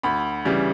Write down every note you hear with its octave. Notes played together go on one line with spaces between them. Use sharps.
D2 B5
C#3 E3 G3